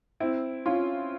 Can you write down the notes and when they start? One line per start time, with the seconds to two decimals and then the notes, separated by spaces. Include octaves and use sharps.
0.20 C4 E4
0.66 C#4 F4